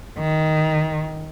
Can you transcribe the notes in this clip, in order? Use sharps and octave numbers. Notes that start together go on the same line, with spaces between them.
D#3